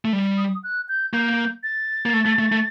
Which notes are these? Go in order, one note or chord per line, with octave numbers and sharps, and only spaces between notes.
A3
G3
D#6
F#6
G6
A#3 G6
A6
A#3
A3
A3
A3
A3